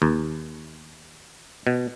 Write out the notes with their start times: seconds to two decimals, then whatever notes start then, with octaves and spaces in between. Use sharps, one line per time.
0.02 D#2
1.67 B2